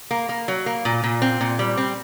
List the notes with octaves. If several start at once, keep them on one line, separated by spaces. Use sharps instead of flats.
A#3
A#3
F#3
A#3
A#2
A#2
C4
A#2
G3
C4